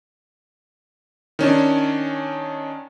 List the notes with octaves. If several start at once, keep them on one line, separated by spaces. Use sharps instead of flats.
D#3 C#4 D4